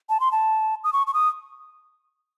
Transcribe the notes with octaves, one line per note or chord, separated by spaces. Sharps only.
A5
C6
A5
D#6
C#6
C#6
D#6